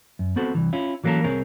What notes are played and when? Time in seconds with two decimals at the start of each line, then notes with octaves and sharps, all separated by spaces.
0.19 F#2
0.36 B3 C4 F#4 A4 C5
0.55 C2 E3
0.73 C#4 E4 F4
1.04 E3 F#3 A#3 C#4 A4 A#4
1.24 C2 C4 G#4 A#4 C#5